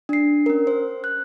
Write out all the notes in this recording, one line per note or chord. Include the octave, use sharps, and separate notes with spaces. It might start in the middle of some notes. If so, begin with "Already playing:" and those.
D4 C7
C#4 A#4
C5
F#6